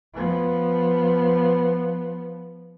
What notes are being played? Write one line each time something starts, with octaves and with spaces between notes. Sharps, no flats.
F3 B3